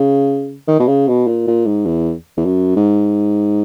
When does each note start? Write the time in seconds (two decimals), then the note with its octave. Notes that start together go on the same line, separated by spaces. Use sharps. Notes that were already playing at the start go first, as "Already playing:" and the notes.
Already playing: C#3
0.68 D#3
0.79 B2
0.88 C#3
1.08 B2
1.27 A#2
1.47 A#2
1.66 G#2
1.86 E2
2.37 E2
2.45 F#2
2.76 G#2